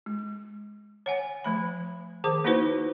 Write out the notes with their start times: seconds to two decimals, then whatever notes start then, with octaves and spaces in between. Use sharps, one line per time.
0.06 G#3
1.06 C#5 F#5 G#5
1.44 F3 A3 B5
2.24 D#3 G#4 C5 D6
2.44 A#3 D#4 E4 F#4 B4 C5